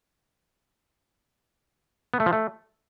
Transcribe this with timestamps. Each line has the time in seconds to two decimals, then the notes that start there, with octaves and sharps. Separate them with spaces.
2.14 B3
2.20 A3
2.26 F3
2.33 A3